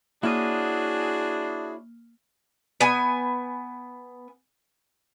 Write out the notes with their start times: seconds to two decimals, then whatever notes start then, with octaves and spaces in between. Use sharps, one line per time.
0.23 A#3 D4 E4 F#4 G#4 C#5 D#5 F6
2.80 B3 G#5